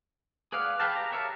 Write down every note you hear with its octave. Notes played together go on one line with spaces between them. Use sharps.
G#4 B4 D5 F5 F#5
G#4 B4 F5 G5 A5
G4 A#5
A#4 C#5 E5 F5 A5